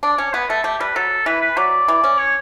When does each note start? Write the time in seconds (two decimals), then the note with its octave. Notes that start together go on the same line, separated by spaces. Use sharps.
0.03 D4 D5
0.18 C#4 C#5
0.34 B3 B4
0.49 A3 A4
0.64 A3 G4
0.80 G3 B4
0.95 F#3 A4
1.26 E3 B4
1.41 B4
1.57 F#3 D5
1.88 E3
2.04 C#4
2.18 C#5